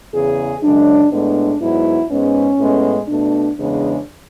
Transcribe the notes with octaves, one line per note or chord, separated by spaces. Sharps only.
E2 C#3 E3 G#4
F#2 C#3 G#3 D4
A2 G#3 B3 D4
G#2 F#3 B3 E4
G#2 G#3 B3 C#4
A2 G#3 B3
B2 A3 D4
E2 C#3 G#3 B3 D4